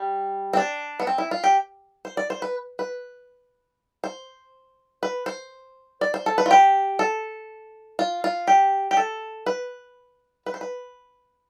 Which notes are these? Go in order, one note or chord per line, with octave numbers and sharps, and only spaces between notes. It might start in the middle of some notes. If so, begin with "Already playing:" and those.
Already playing: G3
C4
D4
B3
C4
E4
F4
G4
C5
D5
C5
B4
B4
C5
B4
C5
D5
C5
A4
B4
F4
G4
A4
F4
F4
G4
G4
A4
B4
B4
C5
B4